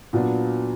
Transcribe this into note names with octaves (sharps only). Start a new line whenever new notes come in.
A#2 F#3 B3 D4